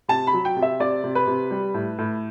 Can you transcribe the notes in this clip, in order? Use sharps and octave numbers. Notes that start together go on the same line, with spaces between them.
C3 A5
B5
F#3
G5
C3
E5
C3 D5
C3
B4
C3
G3
A2
A2